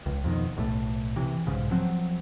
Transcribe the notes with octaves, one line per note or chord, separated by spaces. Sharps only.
C#2
F2 B2 D#3
B1 A2 G3 A3
C3 E3
B1 G#2 C#3
F3 F#3 C4